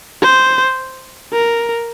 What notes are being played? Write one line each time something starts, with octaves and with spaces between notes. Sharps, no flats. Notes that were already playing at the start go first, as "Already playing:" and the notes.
C5
A#4